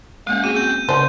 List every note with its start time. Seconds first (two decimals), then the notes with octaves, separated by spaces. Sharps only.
0.27 G#3 A#3 C#4 F5 F#5
0.44 C4 C#4 F#4 G#4 G#5 D#7
0.56 G6
0.89 C#3 F3 C5 D5